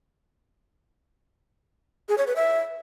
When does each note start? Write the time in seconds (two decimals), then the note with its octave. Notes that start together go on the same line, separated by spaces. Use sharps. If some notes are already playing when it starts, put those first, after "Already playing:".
2.09 G#4
2.18 C#5
2.27 B4
2.36 E5